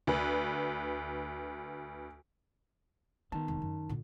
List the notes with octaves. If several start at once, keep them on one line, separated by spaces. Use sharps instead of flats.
D2 B4
D#3 B3 A5
E1
F#2
A#2 D3